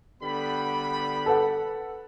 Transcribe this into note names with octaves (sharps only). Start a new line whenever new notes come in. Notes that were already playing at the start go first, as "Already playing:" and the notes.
D3 G3 B3 B5
A4 B4 F#5